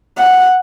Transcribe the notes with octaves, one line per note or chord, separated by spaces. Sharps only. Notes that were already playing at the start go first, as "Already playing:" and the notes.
F#5